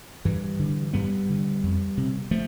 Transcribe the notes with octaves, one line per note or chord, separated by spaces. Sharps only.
G2 E3 G3
D3
G2 G3 B3
D3
F2
C3
F3 A3